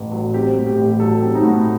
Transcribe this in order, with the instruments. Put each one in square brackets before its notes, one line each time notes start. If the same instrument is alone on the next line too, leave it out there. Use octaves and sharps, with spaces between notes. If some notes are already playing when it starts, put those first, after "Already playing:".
Already playing: [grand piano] A1
F#3
[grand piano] C4 [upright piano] G4
[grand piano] A2
[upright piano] G4
[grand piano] A1
[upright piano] G4
[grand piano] F#3 [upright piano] A4
[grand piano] C4 [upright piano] G4
[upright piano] D#4
[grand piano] A2 [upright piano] F#4